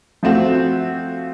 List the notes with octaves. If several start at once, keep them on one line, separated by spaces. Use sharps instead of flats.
F3 A3 C4 F#4